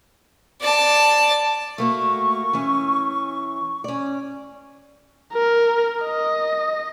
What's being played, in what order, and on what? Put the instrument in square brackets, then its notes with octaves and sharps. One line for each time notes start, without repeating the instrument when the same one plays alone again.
[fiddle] D5 A5
[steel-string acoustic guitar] A3 A#3 F#4 [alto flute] C#6
[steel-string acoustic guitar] E3 C#4
C#4 D5
[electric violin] A#4
D#5